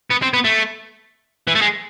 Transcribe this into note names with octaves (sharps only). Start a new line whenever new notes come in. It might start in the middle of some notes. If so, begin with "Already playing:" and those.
B3
C4
B3
A3
E3
A3
G#3